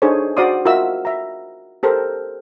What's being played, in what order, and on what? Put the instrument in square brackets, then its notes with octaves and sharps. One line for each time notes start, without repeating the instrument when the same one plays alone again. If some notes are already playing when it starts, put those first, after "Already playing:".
[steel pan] D4 D#4 G#4 A4 C5 C#5
F#4 C5 D5 F5 C6 D#6
F4 F#4 A#4 D#5 E5 E6
E5 A#5
G4 A4 A#4 C5